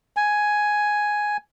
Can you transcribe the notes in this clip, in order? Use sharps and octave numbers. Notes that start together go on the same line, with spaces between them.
G#5